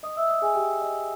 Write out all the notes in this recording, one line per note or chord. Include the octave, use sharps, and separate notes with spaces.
D#5 D#6
E5 E6
D#5 D#6
G#4 G#5
G4 G5
D#5